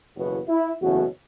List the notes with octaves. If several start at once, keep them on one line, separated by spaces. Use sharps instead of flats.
F#1 E2 B2 B3 F#4
E4
F#1 E2 B2 A3 C#4 F#4